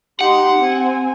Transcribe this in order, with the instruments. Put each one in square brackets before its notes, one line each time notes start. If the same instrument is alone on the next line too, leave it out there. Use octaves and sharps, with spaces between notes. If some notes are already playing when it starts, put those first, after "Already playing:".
[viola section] D#4 G4 C6 [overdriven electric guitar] F#5
[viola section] C4 G#5